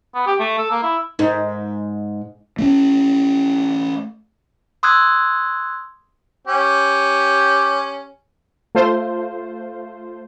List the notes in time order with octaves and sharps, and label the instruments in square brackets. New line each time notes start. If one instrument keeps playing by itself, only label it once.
[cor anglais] B3
G4
A3
A4
A#3
E4
[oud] G#2 [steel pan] D#4
[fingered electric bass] A3 C4 C#4
[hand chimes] C6 D#6 E6 F#6 G#6
[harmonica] C#4 G4
[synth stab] A3 F4 C5